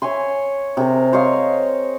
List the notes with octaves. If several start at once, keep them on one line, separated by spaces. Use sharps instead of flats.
C#5 E5 G#5 C6
C3 G#4 A#4
C5 C#5 D#5 F5